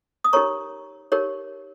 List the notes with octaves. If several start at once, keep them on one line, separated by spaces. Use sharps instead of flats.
D#6
D#4 G4 A#4 C#5 A#5 C#6
D#4 G4 A#4 C#5